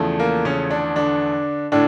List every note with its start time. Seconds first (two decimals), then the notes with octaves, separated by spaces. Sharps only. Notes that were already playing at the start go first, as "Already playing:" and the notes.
Already playing: E2 C#3 F3 A3
0.20 A#3
0.45 C#3 C#4
0.70 D3 D4
0.96 D3 D4
1.72 A2 D3 D4